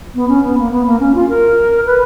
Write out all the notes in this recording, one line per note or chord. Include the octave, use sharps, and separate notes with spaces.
B3
C#4
B3
A#3
B3
A#3
C#4
F4
A#4
B4